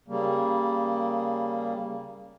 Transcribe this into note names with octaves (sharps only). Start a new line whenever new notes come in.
C#3 G3 A#3